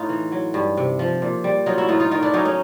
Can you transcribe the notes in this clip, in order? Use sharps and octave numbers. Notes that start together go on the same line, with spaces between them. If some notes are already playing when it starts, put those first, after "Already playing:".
Already playing: A2 D#4 F4
E3
F#3
G2
C3
F3
A#2
G3
F#3 D#4 F4
E4 F#4
A2 D#4 F4
D#4 F4
D#3 D#4 F4
D4 E4
F#3 C#4 D#4
C#4 D#4